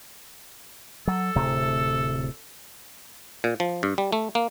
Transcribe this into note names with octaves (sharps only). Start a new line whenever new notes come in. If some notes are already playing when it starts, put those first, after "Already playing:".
F#3 A4
D1 C3 A3
A#2
F3
G2
G3
A3
A#3